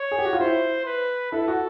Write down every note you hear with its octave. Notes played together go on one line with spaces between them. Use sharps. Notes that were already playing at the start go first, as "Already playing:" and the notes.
Already playing: C#5
G#4
G4
F#4
F4
E4 C5
B4
E4 A4
F#4